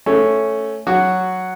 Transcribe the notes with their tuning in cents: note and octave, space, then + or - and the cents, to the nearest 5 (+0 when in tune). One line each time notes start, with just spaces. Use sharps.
A3 +0 C#4 +0 A4 +0
F#3 +0 F#4 +0